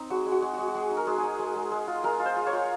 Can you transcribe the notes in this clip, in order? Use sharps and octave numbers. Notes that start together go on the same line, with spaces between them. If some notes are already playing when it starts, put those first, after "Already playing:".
Already playing: C4 D#4
G#3 F#4
G#3
F#4
G#3
G#3 F#4
F#4
G#3 G#4
D#4
A#4
G#3
G#4
D#4
G#3
G#3
G#3
F4
G#3 A#4
F4
C5
F4
C#5
F4